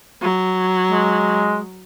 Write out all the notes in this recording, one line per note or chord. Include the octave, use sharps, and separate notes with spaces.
F#3
G#3